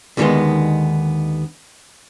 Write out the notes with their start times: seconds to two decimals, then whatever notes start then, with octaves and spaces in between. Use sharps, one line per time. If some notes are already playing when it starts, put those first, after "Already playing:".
0.17 D#2 D3 D#3 G3 G#3 B3